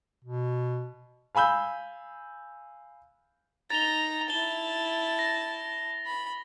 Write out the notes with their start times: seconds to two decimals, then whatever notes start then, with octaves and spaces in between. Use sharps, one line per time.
0.24 B2
1.35 F5 G#5 B5 E6 G6
3.70 D#4 A#5 A6 F7 G7
4.30 E4 A5 G7
5.19 A#6
6.06 B5